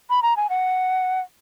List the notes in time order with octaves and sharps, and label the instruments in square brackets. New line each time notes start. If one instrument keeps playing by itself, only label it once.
[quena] B5
A#5
G#5
F#5